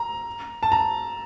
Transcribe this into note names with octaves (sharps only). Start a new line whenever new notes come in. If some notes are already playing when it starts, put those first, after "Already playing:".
Already playing: A#5
A5
A#5